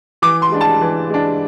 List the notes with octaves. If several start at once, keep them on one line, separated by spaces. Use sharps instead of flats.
E3 D6
C6
G#3 D4
A5
E3
G#3 D4